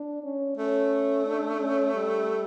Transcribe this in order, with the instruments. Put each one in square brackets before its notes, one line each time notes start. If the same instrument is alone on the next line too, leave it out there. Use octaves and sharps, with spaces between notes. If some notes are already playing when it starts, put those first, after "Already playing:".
Already playing: [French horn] D4
C#4
[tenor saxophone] A3 [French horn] C#4
[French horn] D4
C#4
G3